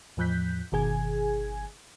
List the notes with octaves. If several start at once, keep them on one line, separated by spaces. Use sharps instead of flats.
E2 A2 F3 F#6 G6 B6
G1 B2 D#3 G#4 G#5 G#6